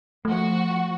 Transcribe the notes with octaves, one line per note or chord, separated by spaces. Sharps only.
F3 A3 F#4